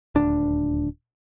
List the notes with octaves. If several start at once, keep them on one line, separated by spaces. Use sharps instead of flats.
D#1 D2 D4